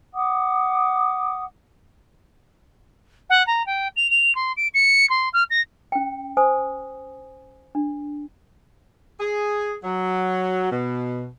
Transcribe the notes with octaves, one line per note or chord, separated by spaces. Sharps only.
F#5 D6 D#6
F#5
A#5
G5
F7
F7
C6
D7
C#7
C6
F6
A#6
C#4 G5
C5 G#5 D#6
D4
G#4
F#3
B2